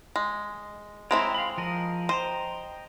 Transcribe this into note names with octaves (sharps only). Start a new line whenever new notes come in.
G#3
G#3 C4 E4 C#5 G5 A#5
F5 B5
F3 A#4 D#5
C5 D#5 G5 A#5